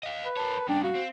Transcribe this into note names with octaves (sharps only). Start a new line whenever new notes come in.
D#5 F5
B4
A#4 C#5 A5
G2 C#3 D4 G5
F#4 F5
C4